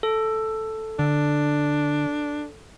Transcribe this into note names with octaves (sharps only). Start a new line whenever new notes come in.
A4
D3 D4